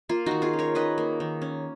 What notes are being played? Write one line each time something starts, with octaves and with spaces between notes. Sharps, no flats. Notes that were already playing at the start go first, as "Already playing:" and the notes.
A#3 F4
D#3 D#4 F#4
F4 G#4
C#4
A#4 C#5
D#3 B4 D#5
A#3
D#3
C#4